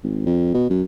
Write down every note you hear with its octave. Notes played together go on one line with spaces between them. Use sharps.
G#1
F2
B2
F#2